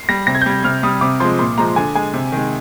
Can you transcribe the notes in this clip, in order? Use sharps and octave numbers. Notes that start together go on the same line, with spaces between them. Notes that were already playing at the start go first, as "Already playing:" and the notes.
Already playing: C7
G3 A#6
C3 A#6
G#6
G6
G3 G#6
C3 F6
G3 D#6
C3 D6
F3 G#3 C6
A#2 C6
F3 G#3 A#5
D3 G#5
G#3 G#5
C3
D#3 G#3